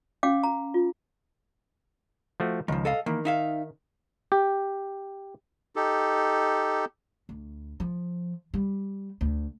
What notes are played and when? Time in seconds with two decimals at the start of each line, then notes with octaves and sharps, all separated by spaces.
0.23 C#4 F5 G5 D6
0.44 A#5
0.74 F4
2.40 F3 A3 F#4
2.68 C#2 D#3 F3
2.85 A4 D#5 F5
3.06 D#3 E3 A#3
3.25 D#4 E5 F5
4.32 G4
5.76 D#4 G4 A4
7.29 D2
7.80 F3
8.54 G3
9.21 D2